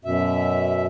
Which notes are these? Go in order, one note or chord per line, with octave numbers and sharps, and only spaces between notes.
F#2 B2 E5